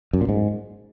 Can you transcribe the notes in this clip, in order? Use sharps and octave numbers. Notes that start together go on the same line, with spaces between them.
F#2
A#2
G#2